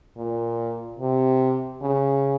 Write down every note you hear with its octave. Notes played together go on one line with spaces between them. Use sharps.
A#2
C3
C#3